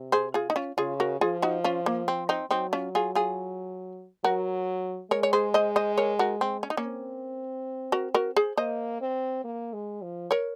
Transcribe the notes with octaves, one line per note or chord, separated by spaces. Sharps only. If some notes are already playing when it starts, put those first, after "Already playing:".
Already playing: C3
G#4 C5
F4 G#4
D#4
C#4 F4
C#3 F4 G#4
F#4 A#4
F3 F4 G#4
D#4 F#4
C#4 F4
A#3
C4
C4 D#4
F#3 C4 D#4
C#4 F4
F4 G#4
F4 G#4
F#3 F#4 A#4
G#3 A#4 C#5
C#5
G#4 C5
C5 D#5
C5 D#5
A#4 C#5
F#4 A#4
C4
C#4
D#4
A#3 C#4
C4
F#4 A#4
F#4 A#4
G#4 C5
A#3 C5 D#5
C4
A#3
G#3
F3
A#4 C#5